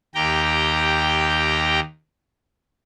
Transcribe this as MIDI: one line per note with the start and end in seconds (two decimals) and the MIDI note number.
0.15 1.80 39
0.15 1.80 67
0.15 1.80 79
0.15 1.80 82